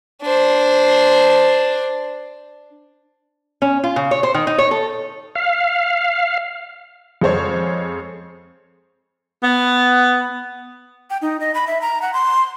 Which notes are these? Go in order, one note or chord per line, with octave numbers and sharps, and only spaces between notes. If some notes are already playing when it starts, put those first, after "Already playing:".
D4 C5
C#4
F4
C#3
C#5
C5
D#3
D#4
C#5
A4
F5
F2 G#3 C5 C#5
B3
G5
D#4
D#5
B5
E5
A#5
F#5
C6